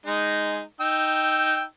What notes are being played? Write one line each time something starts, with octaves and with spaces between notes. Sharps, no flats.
G#3 D#4
D#4 G5 E6